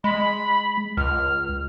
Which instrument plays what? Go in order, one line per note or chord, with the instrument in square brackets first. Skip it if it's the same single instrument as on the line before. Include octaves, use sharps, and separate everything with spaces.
[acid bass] G#3 [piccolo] B5
[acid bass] C#2 [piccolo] F6